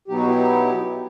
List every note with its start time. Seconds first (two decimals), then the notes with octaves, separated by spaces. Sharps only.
0.08 B2 F#3 B3 D#4 G4
0.17 F#4
0.27 E4 G4